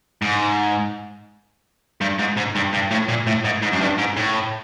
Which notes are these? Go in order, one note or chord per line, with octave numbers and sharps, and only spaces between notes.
G#2
G2
G#2
G#2
G2
G2
A2
A#2
A2
G#2
G#2
F#2
G2
G#2
A2